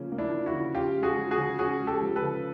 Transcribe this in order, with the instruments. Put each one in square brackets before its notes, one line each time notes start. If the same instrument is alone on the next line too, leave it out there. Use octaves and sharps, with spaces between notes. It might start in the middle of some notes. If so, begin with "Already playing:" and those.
Already playing: [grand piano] C#3 F3 A#3 C#4
A#3
[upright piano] D4 E4
[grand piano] F3
[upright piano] E4 F#4
[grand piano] C#3
[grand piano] C#4 [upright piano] F4 G4
[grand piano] G#3
[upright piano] F#4 G#4
[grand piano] F3
[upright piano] F#4 G#4
[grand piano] C#3
[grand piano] C#4 [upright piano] F#4 G#4
[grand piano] G#3
[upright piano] G4 A4
[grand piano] F3
[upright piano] A4 B4
[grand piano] C#3